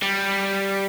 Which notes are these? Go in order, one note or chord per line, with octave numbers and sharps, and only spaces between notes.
G3